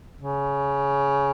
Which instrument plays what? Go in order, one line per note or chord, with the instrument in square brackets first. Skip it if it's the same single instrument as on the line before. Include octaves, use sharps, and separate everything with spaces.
[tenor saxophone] C#3